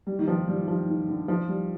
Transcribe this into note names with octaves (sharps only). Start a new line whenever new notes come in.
G3
D#3
F3
G3
F3
D#3
D3
F3
G3